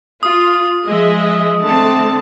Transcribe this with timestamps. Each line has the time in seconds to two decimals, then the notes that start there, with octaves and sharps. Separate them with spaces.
0.23 F4 D#6
0.87 F3 G#3 D#5 E5
1.63 D3 A3 C4 A5